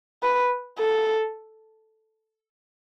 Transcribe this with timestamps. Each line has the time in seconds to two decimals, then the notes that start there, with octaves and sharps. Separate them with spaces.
0.23 B4
0.79 A4